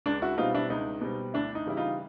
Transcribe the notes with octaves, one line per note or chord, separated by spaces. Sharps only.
C#2 D4
E4 F#4
B2 G3 C4 D#4 F4
D4 E4
C#2 D#4
B2 G3 C4
D2 D4 E4
D#4
C#3 E3 G3 E4
D#4 F4